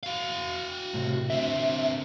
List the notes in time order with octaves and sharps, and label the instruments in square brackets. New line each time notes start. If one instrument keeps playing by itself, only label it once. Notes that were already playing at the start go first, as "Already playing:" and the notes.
[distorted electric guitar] F#4 F5
[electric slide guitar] A2 C3
[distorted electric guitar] D3 C4 [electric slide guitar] E5